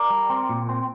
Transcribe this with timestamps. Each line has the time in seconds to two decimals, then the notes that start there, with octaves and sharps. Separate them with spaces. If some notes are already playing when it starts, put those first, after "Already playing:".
Already playing: A#4 D5
0.10 G3
0.30 C4
0.49 A#2
0.69 C4